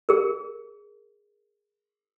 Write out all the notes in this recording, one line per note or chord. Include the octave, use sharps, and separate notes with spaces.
G#4 A#4